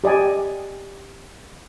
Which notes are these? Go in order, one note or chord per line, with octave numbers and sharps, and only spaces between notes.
G4 D5 D#5 G#5